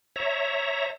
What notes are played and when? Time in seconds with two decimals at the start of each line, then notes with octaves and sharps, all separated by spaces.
0.16 C#5 E5 A#5